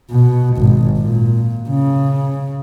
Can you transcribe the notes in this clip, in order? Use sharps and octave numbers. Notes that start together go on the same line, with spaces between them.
B2
G#1
A#2
C#3